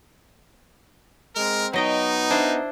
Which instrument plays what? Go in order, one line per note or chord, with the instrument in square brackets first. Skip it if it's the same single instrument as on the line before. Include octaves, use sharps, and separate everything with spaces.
[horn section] G#3 C4 A#4
[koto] F#3 D#5 G5 [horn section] B3 D#4
[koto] D4 E4 C5